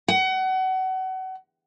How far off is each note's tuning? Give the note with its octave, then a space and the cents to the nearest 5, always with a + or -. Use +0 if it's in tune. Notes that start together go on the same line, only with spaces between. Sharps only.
F#5 +30